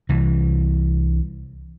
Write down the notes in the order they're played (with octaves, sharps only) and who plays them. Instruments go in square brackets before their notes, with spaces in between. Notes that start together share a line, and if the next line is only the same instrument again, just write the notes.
[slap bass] C2 E3